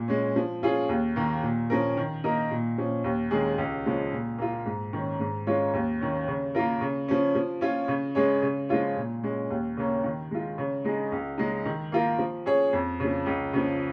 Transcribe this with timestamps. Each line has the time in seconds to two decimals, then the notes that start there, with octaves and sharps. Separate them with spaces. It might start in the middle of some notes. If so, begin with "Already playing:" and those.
Already playing: A#2
0.08 G#3 C#4
0.36 F3
0.63 C#4 F4 G#4
0.89 D#2
1.16 D#3 A#3
1.42 A#2
1.70 F3 C#4 A#4
1.97 D#3
2.24 A#3 D#4 A#4
2.51 A#2
2.78 F3 C#4
3.04 D#2
3.31 D#3 G#3 C#4 G#4
3.58 C#2
3.86 C#3 F3 G#3
4.12 A#2
4.38 A#3 F4
4.66 G#2
4.93 D#3 C#4
5.20 G#2
5.47 G#3 C#4 F4 C#5
5.74 D#2
6.01 D#3 C#4
6.28 C#3
6.55 A#3 F4 A#4
6.81 C#3
7.08 F3 C#4
7.35 F3
7.61 C#4 F4 C#5
7.88 C#3
8.15 G#3 C#4 G#4 C#5
8.42 C#3
8.69 F3 G#3 F4 C#5
8.97 A#2
9.23 G#3 C#4
9.50 D#2
9.77 C#3 A#3 C#4
10.04 D#3
10.31 G#3 F4
10.58 C#3
10.85 G#3 D#4 G#4
11.12 C#2
11.38 C#3 G#3 D#4
11.65 D#3
11.92 A#3 F4 A#4
12.18 F3
12.46 C#4 G#4 C#5
12.73 F2
13.00 C#3 F3
13.26 C#2
13.53 C#3 F3